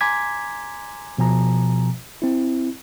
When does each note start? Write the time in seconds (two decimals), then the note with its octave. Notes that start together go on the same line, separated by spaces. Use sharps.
0.01 G#5 A#5 C6 D6 G#6 B6
1.18 B2 F3 G#5 A#5
2.22 C4 E4